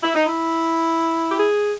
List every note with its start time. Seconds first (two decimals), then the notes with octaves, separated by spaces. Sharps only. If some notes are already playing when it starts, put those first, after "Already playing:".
0.03 E4
0.15 D#4
0.26 E4
1.32 G4
1.40 G#4